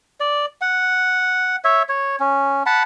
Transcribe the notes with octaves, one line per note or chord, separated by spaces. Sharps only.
D5
F#5
C#5 E5
C#5
C#4
F#5 A5 B5